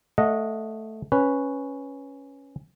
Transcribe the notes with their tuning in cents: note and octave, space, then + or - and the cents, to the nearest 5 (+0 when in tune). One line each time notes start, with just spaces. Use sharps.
A3 +0 D#5 +0 F#5 -25
C#4 +0 B4 +0